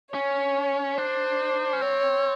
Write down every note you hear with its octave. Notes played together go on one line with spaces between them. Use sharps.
C#4 C#5
D4 C5
C#4
C4 C#5